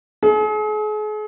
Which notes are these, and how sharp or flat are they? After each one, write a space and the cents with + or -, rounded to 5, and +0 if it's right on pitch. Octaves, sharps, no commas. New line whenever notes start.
G#4 +40